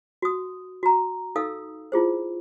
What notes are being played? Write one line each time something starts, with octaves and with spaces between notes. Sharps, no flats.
F#4 D#6
F#4 A#5
D#4 A4 F5 D#6 E6
E4 F4 G#4 C5